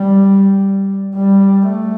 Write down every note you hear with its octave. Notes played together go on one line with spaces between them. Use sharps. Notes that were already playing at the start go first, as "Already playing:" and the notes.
Already playing: G3
G3
A3